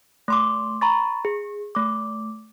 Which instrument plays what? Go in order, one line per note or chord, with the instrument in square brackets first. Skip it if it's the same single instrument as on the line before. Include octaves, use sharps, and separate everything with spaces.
[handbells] A3 C6 D6
A#5 B5 C#6 A6
G#4
A3 D6